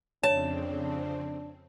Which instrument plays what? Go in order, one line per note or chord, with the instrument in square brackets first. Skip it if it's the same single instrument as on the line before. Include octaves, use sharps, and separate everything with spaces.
[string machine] F2 C#3 C4 [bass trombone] D4 [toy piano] C#5 [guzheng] A5